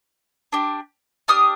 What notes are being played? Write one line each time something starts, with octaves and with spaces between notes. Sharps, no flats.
D4 G4
D4 G4 D#6 F6